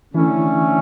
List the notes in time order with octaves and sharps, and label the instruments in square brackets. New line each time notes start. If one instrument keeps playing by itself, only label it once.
[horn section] D3 A3 C#4 [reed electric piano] E3 E4